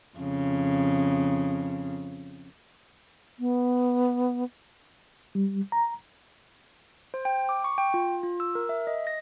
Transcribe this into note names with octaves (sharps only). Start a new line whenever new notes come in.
F2 C#3
B3
G3
A#5
C5
G5
D6
C#6
G5
F4
F4
E6
A#4
E5
D#5
A#6